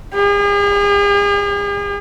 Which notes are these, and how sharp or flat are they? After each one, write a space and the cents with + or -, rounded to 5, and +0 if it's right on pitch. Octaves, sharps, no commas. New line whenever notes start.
G#4 -45